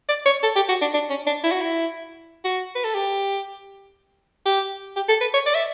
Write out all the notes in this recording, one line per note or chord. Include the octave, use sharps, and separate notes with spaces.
D5
C#5
A4
G4
F#4
D4
D4
C#4
D4
E4
F#4
E4
F#4
B4
A4
G4
G4
G4
A4
B4
C#5
D5
E5